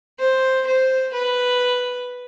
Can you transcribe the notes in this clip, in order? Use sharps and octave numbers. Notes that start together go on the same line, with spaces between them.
C5
C5
B4